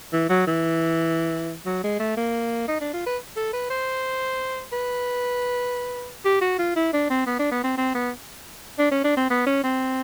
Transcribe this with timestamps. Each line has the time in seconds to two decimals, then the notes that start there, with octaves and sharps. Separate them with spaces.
0.13 E3
0.30 F#3
0.47 E3
1.66 F#3
1.84 G#3
2.00 A3
2.17 A#3
2.68 D#4
2.81 D4
2.94 F4
3.06 B4
3.37 A4
3.53 B4
3.70 C5
4.72 B4
6.25 G4
6.41 F#4
6.59 F4
6.76 E4
6.93 D4
7.10 C4
7.27 B3
7.39 D4
7.51 B3
7.64 C4
7.77 C4
7.95 B3
8.79 D4
8.91 C#4
9.04 D4
9.17 C4
9.30 B3
9.47 C#4
9.64 C4